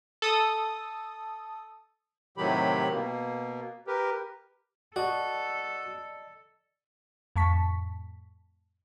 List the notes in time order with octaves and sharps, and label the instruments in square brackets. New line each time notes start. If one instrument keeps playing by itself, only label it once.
[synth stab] A4 D#6
[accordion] A2 C3 D#3 F#3 G4 B5
B2 A#3
G4 A#4 B4
[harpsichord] F#4 [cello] A4 [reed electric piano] D5 D#5 A5
[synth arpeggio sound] F2 A2 A5 C#6 B6